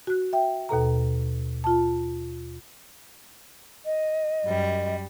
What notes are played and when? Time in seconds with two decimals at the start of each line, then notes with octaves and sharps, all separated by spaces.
0.07 F#4 F#6
0.33 E5 G5
0.69 D#2 B2 A4 A#5
1.64 F4 A5
3.86 D#5
4.43 F#2 G3